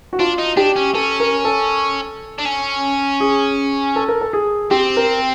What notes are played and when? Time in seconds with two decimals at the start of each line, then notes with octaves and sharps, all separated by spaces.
0.13 F#4
0.19 D4 F4
0.38 D#4
0.57 D4 G4
0.76 C#4
0.94 C#4 A4
1.20 A#4
1.45 A4
2.38 D4
2.45 C#4
3.20 G#4
3.96 A4
4.08 A#4
4.21 A4
4.33 G#4
4.71 C4 G4
4.97 A#4